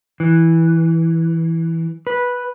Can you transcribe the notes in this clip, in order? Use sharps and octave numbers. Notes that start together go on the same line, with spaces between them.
E3
B4